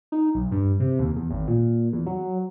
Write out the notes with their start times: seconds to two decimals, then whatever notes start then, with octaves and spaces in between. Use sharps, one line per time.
0.12 D#4
0.35 B1
0.51 G2
0.80 C3
0.99 D#2
1.16 E2
1.30 G#1
1.48 A#2
1.93 E2
2.06 F#3